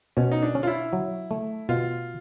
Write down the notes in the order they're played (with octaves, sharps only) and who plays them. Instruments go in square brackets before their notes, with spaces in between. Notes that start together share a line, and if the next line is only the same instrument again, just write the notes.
[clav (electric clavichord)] B2 [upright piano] C#4
[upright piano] D#4
D4
[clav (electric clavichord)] C#4
[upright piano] F4
E4
[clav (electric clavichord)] F#3
A3
[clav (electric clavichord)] B2 [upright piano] F4